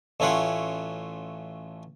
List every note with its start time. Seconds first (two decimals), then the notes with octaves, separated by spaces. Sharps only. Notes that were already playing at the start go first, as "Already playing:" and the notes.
0.20 A1 A3 C#4 E4 F4 F#5